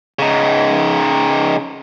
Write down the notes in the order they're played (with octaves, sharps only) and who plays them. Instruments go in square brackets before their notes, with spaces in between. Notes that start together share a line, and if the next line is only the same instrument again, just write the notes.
[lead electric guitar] C#3 D#4